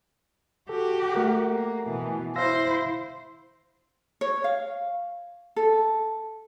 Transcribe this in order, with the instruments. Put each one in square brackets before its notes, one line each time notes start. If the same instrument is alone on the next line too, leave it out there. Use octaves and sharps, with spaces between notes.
[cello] F#4 G4 [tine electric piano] A4
[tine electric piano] A3 A#4 F#5
[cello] A#3
B2 E3
[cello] E4 C5 [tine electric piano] F5 E6 A#6
[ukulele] C#5
F5
A4